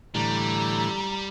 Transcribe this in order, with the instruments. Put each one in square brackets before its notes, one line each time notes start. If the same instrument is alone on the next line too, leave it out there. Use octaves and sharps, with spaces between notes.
[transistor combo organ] A2 D3 E3 [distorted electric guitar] G3 [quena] A#5